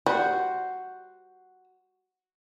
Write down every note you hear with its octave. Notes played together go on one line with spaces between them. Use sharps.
G3 F#4 C5